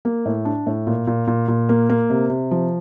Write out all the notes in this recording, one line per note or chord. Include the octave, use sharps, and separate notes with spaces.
A#3
A2
D4
A2
A#2
A#2
A#2
A#2
A#3
A#3
C3
C3
F3